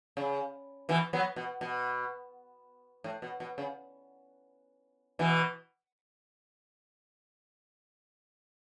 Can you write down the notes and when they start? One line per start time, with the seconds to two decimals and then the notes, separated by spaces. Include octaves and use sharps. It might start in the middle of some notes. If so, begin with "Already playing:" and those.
0.17 C#3
0.89 B2 E3
1.13 F#3 B3
1.36 B2
1.61 B2
3.04 A2
3.22 B2
3.40 B2
3.58 C#3
5.19 B2 E3